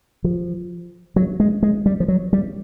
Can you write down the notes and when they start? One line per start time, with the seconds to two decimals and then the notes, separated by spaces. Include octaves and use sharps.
0.24 F3
1.16 F#3
1.40 G#3
1.63 G#3
1.86 G3
2.00 F3
2.08 F#3
2.33 G3